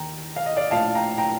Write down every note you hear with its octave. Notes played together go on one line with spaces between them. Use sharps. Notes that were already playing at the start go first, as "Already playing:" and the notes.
Already playing: D#2 D#3 G5 A#5
F5
D#5
D5 F5
A#1 A2 F3 F5 A5
G5 A#5
G5 A#5